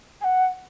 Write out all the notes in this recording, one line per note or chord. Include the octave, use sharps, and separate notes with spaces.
G#5
F#5